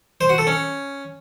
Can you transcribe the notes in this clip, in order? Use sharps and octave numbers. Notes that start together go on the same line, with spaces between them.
C5
F#4
A4
C#4